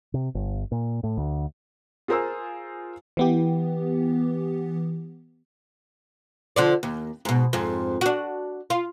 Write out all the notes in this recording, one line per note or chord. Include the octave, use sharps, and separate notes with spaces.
C3
G1
A#2
A2
D2
F4 G#4 A#4 C5 G#5 E6
E3 B3 G4
D3 F3 D5
D#2
G#2 B2
F2 G#2
D4 F#4
F4